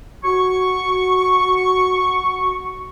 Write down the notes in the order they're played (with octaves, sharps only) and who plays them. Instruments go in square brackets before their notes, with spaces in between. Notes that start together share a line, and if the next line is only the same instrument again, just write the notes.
[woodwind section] F#4 C#6